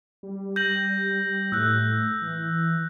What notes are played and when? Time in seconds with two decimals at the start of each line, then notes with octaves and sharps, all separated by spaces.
0.23 G3
0.56 G6 A#6 F#7
1.52 A2 E6 F#6
2.22 E3